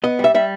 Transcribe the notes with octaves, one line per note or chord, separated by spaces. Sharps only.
B3 D#5
G3
E5
G3 E5